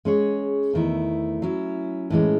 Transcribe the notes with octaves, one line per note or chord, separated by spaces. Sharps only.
G#3 C#4 G#4 C#5
E2 D#3 A3 E4
F#3 C#4 E4
A2 E3 G#3 C#4